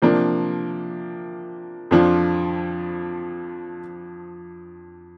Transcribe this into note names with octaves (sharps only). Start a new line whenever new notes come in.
C3 F3 A#3 D4
F2 F3 D4 F4